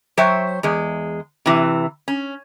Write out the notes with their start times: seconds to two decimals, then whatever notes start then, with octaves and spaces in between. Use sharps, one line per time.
0.17 F#3 C5 C#5 E5 G5
0.63 E2 G#3
1.46 C3 E3
2.08 C#4